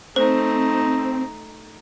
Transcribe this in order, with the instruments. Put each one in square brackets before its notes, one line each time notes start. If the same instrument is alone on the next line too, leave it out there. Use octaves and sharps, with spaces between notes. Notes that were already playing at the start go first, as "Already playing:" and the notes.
[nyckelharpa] A3 D#4 [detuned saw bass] C4 [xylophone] C5